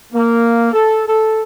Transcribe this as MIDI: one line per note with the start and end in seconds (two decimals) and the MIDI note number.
0.13 0.71 58
0.73 1.04 69
1.07 1.42 69